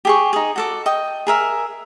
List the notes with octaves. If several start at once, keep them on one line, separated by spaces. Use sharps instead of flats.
G4 G#4 C#6
D#4 G#4
F#4 A4 D6
D#5 G5
G#4 A#4 E5